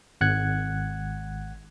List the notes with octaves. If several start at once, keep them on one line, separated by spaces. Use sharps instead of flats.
G#1 F#5 F#6 G#6